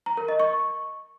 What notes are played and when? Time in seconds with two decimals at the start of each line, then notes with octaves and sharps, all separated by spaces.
0.06 A#5
0.17 A#4
0.28 D#5
0.40 C#6